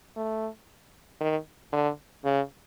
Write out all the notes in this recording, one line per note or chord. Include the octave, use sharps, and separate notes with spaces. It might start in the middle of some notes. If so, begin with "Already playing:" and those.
A3
D#3
D3
C#3